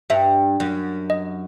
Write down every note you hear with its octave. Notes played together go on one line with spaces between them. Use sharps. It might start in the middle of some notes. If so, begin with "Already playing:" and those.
G2 E5
F#2
D#5